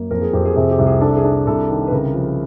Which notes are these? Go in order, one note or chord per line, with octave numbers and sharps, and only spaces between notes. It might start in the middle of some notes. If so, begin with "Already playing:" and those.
Already playing: F#2 A#3
F2 A#4
G#4
F2 G4
G#4
C3 G#4
G4
C2
G#4
D4 A4
G#4
D4
G#4
C2 A4
D#3
B4
C#3 A#4
F3